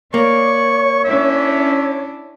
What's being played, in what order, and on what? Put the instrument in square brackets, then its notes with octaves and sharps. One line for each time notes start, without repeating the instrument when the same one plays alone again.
[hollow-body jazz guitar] A#3 [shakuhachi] C#5 [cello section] D5 [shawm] C#6
[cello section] C#4 D4 E4 [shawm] E5